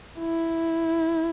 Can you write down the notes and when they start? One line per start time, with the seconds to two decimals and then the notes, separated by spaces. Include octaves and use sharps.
0.19 E4